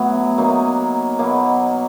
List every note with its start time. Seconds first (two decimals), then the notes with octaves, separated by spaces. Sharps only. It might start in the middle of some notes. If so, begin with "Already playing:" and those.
Already playing: A2 F#3 B3
0.38 F#3 A#3 D#4
1.19 B2 F#3 A#3